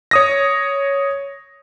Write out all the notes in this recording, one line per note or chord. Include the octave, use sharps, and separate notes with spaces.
C#5 D#6 A#6